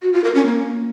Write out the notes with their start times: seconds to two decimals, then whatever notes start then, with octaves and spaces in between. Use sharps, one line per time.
0.02 F#4
0.13 F4
0.24 A#4
0.35 C#4
0.46 A#3